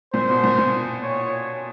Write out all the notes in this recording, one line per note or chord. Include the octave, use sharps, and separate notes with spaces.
A#2 C5
B2
A#2
A#2
C#5